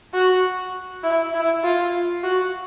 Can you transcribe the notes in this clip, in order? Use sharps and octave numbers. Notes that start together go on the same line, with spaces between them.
F#4
E4
E4
F4
F#4